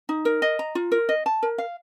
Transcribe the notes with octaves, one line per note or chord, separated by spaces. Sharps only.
D#4
A#4
D#5
A#5
F4
A#4
D#5
A5
A#4
F5